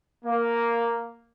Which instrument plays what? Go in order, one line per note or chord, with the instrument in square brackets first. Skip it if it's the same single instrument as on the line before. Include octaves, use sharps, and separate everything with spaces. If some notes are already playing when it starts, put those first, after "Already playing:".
[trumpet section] A#3